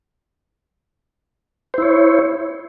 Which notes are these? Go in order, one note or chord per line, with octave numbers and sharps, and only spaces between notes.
E4 C5 C#5